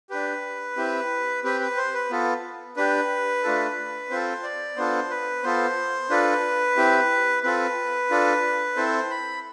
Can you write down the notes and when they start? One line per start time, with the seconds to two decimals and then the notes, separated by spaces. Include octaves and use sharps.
0.10 D4 G4 B4
0.77 C4 E4 G4
1.44 C4 G4 B4
1.61 B4
1.77 C5
1.94 B4
2.10 B3 F4 A4
2.77 D4 G4 B4
3.44 A3 D4 F4 A4
4.10 C4 F4 A4 C5
4.43 D5
4.77 B3 D4 F4 A4 C5
5.10 B4
5.43 B3 F4 A4 C5
6.10 D4 F4 A4 B4
6.77 C4 E4 G4
7.43 C4 F4 A4 B4
8.10 D4 F4 A4
8.76 C4 E4 A4 C5
9.10 B5